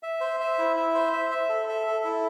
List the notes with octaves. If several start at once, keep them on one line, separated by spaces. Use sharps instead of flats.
E5
C5
E5
E4
E5
C5
E5
E5
A4
E5
A4
E4